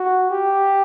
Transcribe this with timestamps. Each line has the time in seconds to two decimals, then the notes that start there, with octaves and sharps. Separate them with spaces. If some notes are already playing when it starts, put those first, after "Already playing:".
Already playing: F#4
0.30 G4